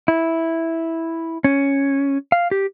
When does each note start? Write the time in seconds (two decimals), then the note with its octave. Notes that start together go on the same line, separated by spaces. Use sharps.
0.08 E4
1.44 C#4
2.32 F5
2.51 G4